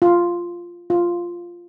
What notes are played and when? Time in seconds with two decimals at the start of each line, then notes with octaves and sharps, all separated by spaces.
0.02 F4
0.90 F4